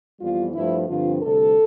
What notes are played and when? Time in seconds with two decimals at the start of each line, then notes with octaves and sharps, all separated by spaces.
0.20 F2 E3 G3 B3 F4
0.54 G2 F3 A3 E4
0.88 G2 D3 F3 C4 F4
1.21 D2 C3 G3 A4